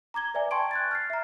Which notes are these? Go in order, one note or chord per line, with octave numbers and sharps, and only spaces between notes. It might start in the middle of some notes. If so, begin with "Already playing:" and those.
A#5 D6 G#6 G7
B4 D5 E5 G#5
G5 A5 C6 C#6 G#6 D7
F#6 G#6 A6
F6 A6 C7
E5 A#5